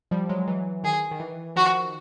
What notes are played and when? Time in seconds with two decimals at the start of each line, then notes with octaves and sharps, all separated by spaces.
0.11 F3 G3
0.29 F#3 G#3
0.47 E3 F#3
0.84 D#3 G#4
1.11 D#3
1.20 E3
1.56 D#3 F3 F#4